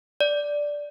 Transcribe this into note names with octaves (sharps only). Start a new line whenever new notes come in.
D5